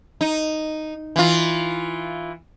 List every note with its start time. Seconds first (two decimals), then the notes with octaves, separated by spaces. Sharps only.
0.21 D#4
1.16 E3 F4